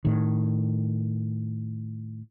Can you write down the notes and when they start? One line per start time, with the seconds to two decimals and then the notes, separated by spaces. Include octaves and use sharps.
0.05 A2 D#3